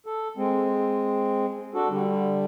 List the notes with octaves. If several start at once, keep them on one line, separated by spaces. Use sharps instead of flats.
A4
G#3 C4
D4 F#4 A4
D3 G3